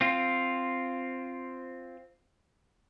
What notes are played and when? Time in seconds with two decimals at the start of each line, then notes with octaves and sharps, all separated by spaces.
0.01 C4 F4